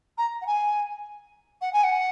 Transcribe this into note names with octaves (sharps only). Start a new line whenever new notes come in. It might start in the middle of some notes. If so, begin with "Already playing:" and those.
A#5
F#5
G#5
F#5
G#5
F#5